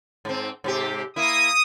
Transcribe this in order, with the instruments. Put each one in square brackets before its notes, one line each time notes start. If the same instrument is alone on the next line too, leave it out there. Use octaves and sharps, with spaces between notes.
[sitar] G#2 C4
G#2 C3 G4
[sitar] A#3 E4 [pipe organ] D#6